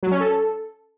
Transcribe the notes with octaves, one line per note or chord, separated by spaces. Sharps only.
F#3
C#4
A4